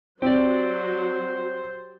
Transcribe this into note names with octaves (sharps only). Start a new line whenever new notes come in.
F#3 C4 G4 C5 D5